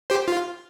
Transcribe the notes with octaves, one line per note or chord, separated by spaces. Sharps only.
G4 C5
F4